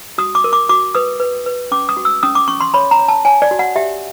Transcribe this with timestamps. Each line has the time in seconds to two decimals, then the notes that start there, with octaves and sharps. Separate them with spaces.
0.18 F#4 D#6
0.35 D6
0.44 A#4
0.53 D6
0.69 F#4 D6
0.95 B4 D#6
1.20 B4
1.46 B4
1.72 C#4 D6
1.89 D#6
1.97 F#4
2.05 E6
2.23 C#4 D#6
2.35 D6
2.48 C#4 C#6
2.60 C6
2.74 C#5 B5
2.91 A#5
2.99 C#5
3.08 A5
3.25 C#5 G#5
3.42 D5
3.51 F#4
3.59 F#5
3.76 G4 E5